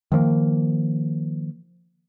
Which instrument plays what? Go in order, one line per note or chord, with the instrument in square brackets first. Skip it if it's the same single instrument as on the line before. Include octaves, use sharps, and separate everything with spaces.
[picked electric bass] D#3 F3 A3 A#3